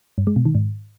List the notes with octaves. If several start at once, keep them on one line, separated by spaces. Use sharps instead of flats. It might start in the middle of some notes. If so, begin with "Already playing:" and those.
G2
G#3
B2
D#3
G#2